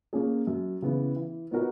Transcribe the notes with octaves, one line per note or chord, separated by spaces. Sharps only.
A#3 C#4 G#4
F#2
C#3 E3 B3
E3
B3 D#4 F#4 A#4